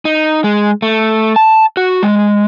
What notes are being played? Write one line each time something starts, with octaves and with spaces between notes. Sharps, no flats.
D#4
G#3
A3
A5
F#4
G#3